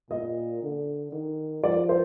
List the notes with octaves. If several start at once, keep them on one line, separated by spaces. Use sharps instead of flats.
A#2 D#5
D3
D#3
F3 D5
C5